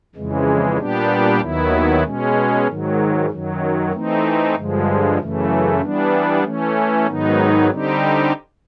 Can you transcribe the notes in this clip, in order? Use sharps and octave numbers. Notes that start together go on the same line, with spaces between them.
F2 C#3 E3 G#3
A#2 G3 B3 D4 G4
D#2 D#3 F#3 B3 E4
B2 G#3 C#4
G#2 D#3 F#3
F#2 D#3 F#3
E3 A3 C4 D#4
G2 D3 F3 G#3
F#2 C#3 E3 A3
E3 G3 B3 D4
E3 A3 C#4
G#2 D#3 F#3 B3 D#4
D3 G3 C4 D#4 G4